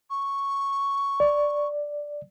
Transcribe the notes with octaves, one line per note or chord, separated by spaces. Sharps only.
C#6
D5